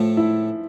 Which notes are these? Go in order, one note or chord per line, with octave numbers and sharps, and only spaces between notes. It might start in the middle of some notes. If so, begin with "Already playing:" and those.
Already playing: A2 F3 A3
E4